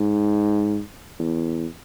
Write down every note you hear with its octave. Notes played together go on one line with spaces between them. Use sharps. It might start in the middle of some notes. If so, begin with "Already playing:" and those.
Already playing: G#2
E2